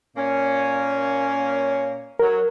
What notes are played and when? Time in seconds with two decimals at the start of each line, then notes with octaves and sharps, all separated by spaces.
0.15 A#2 A#3 C#4
2.19 F#3 A#4